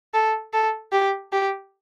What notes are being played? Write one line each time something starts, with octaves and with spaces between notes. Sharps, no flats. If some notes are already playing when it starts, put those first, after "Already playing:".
A4
A4
G4
G4